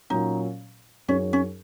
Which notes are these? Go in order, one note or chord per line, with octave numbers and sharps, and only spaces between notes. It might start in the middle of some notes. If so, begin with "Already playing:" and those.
A#2 F#3 C#4 D#4
F#2 F#3 C#4 D#4 G#4 C#5
C#4